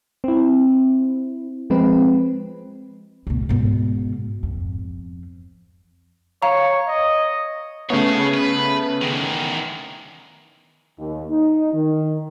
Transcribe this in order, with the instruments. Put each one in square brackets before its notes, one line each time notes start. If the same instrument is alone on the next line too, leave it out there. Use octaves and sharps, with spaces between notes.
[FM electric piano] C4 E4
F3 G#3 C4 B4
[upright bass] D2 B2
G#2 B2
F2
[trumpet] C#5 [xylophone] F5 A#5
[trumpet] D#5
[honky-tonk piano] C#3 A3 B3 [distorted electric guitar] G#4 C#5
[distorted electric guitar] B4
E2 D#3
[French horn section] D#2
D#4
D#3